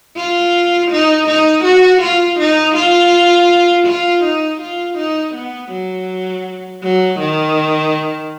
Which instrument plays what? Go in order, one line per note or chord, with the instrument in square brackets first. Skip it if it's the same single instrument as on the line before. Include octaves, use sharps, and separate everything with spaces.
[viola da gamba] F4
D#4
D#4
F#4
F4
D#4
F4
F4
D#4
F4
D#4
B3
F#3
F#3
D#3